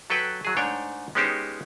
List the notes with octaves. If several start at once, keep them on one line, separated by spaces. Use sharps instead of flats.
F#3 A4 B4 G5
F#3 G#4
G#2 A3 D4 C#5 G5
G#3 B3 C#4 D#4 G4 C5